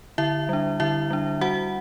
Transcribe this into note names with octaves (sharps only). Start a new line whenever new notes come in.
D3 E4 E5
G3 D4
D3 E4 E5
G3 D4
G3 F#4 F#5